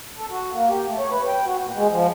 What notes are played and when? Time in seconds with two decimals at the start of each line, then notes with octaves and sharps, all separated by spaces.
0.17 A4
0.30 F#4
0.53 A#3
0.69 G4
0.86 A3
0.99 C#5
1.12 B4
1.27 G5
1.45 F#4
1.64 A#2
1.76 G#3
1.91 F3